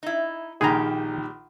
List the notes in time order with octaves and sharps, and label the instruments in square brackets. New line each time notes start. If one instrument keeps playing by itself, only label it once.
[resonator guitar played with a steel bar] D#4 E4
[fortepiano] A#1 D#3 [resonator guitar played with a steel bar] A#2 G3 G4 [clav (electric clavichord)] G#4 A#5